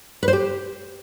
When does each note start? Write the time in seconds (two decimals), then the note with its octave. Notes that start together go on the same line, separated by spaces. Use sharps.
0.23 B4
0.28 C5
0.33 G4